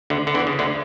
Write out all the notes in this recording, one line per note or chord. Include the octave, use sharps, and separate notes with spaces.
D2 D3
D3
E2 E3
C#3
D2 D3